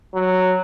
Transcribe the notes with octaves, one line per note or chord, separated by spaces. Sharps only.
F#3